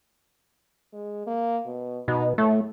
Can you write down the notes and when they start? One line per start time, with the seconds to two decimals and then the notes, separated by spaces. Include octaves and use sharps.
0.93 G#3
1.27 A#3
1.66 B2
2.08 B2 D#4
2.38 A2 A3